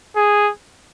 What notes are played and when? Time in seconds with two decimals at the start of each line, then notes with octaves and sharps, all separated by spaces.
0.16 G#4